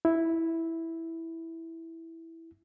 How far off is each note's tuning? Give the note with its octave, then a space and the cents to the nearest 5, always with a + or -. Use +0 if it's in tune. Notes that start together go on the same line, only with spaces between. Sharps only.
E4 -5